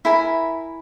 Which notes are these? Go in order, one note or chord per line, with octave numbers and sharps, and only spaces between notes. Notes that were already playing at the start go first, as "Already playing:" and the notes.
E4 A#4 G#5 B5